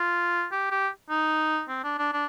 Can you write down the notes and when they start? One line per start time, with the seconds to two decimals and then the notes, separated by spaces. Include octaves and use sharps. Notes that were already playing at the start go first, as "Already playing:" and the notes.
Already playing: F4
0.52 G4
0.71 G4
1.10 D#4
1.69 C4
1.84 D4
1.99 D4
2.13 D4